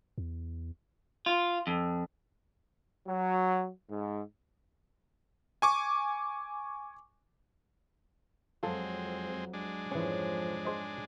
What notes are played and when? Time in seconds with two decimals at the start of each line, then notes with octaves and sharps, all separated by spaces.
0.18 E2
1.26 F4
1.67 F2
3.08 F#3
3.90 G#2
5.62 G#5 C#6 D6
8.63 F2 F#3 G#3 C4 F4 A4
9.53 G#3 D4
9.91 F2 G#2 E3 F3 C#4 C#5 G#5
10.65 G#4 C5 D#5